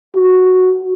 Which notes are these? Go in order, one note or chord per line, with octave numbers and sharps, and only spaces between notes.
F#4